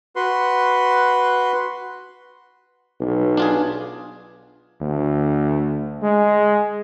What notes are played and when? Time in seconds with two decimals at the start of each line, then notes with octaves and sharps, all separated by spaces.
0.16 F#4 B4 C6
3.00 B1
3.37 D4 F4 G#4
4.81 D2
6.03 G#3